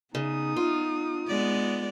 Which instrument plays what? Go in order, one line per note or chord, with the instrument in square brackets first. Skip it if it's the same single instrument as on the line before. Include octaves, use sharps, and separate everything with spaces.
[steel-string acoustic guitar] C#3 [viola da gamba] B3 [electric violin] D#4 D#6
[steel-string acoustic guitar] F4
[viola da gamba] G#3 B3 D5